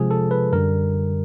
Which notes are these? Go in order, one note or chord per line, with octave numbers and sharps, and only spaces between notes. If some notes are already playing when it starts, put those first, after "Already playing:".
Already playing: C3 F3 G#3 G#4
A4
B4
F#2 D3 G3 A#4